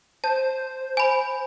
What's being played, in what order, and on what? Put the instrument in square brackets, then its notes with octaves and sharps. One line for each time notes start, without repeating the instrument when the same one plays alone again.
[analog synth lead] C5 [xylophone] A5
[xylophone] G#5 B5